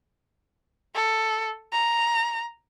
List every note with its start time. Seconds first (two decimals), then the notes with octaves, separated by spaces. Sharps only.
0.95 A4
1.73 A#5